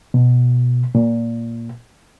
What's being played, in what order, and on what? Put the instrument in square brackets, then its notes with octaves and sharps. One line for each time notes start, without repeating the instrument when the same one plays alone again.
[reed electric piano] B2
A#2